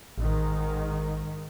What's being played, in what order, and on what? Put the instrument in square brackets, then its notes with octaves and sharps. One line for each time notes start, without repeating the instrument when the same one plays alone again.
[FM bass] A1 [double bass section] G#2 D#3